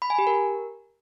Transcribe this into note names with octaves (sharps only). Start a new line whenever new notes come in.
B5
G#5
G4
A#4